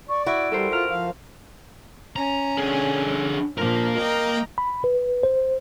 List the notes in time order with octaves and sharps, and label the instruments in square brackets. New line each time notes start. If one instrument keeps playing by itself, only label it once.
[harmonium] D5 [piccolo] C#6
[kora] E4 F#4 [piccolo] D7
[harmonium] G3 [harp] A4 A#4 C5
[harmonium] F4 [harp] E5 A#5 F6
[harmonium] F3 F5
[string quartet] C#4 [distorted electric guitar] A#5
[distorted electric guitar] D3 G#4
[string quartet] A#2 F3 D4 [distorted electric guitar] A#3 A#4
[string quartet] D#5 G5 A#5
[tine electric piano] B5
B4
C5